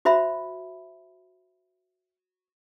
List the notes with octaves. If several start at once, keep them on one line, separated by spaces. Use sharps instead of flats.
F#4 C5 E5 B5